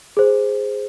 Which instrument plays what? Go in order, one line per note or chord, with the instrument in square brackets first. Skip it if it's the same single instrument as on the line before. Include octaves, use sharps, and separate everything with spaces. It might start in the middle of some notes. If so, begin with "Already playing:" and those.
[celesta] G#4 C5